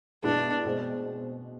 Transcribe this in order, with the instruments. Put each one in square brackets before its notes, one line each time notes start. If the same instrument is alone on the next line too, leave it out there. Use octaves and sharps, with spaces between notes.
[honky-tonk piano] B2 G#3 B3 E4 [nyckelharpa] D4
[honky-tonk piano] B2 G#3 C4